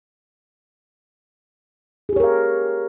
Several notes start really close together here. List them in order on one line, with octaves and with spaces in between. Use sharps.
G#4 G4 C#5 A#4 F5